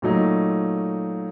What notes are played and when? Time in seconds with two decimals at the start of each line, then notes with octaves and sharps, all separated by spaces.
0.02 A#2 F#3 A3 D#4